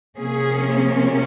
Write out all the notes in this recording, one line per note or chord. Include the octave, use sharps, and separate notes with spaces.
C3 F3 A#3 C#4 G#4